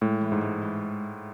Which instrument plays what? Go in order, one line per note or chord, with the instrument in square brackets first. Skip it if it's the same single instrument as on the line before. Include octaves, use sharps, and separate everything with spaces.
[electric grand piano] A2 [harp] G#3
[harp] E3
[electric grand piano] G#2
[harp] G#3
E3